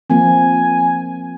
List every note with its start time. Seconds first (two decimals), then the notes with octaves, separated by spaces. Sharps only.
0.10 F3 A#3 C4 G#5